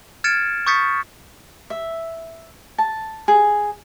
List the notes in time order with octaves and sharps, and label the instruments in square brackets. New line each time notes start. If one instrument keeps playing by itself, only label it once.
[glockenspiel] F6 G#6 A6 C#7 D7 E7
C#6 D#6 G6 A6 B6 C#7
[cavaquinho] E5
A5
G#4